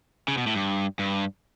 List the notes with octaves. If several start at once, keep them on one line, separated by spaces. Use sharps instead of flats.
C#3
B2
A2
G2
G2